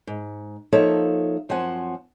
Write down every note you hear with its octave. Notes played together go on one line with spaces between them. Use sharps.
G#2
F3 A#3 D#4 A4 C#5 E5
F#2 F3 C4 C#5 F#5 G#5